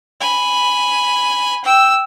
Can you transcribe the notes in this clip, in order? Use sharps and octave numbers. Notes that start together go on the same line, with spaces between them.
G#5 B5
G5 E6